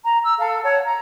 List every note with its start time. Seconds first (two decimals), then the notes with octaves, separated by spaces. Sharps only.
0.04 A#5
0.22 E6
0.38 A4 F5
0.63 C#5 F#5 A5
0.84 A#5